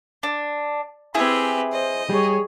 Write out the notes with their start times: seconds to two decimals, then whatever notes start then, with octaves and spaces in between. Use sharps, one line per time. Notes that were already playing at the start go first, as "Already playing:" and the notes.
0.23 D4
1.15 C4 E4 G4 G#4 B4
1.73 C5 D#5
2.09 G3 G#4 C#5